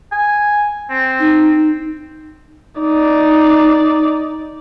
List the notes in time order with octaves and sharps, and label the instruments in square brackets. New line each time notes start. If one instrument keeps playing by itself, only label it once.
[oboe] G#5
C4
[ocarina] D#4
[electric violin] D#4 D5